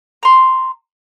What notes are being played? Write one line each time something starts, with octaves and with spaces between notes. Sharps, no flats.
A#5 C6